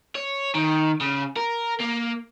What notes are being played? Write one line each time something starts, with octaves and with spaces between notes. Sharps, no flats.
C#5
D#3
C#3
A#4
A#3